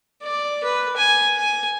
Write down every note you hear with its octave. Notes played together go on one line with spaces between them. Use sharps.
D5
B4
G#5
G#5